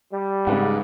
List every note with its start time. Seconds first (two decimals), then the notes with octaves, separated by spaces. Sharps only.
0.11 G3
0.47 G#2 C#3 B4 F#5